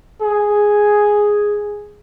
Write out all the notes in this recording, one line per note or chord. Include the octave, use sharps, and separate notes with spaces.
G#4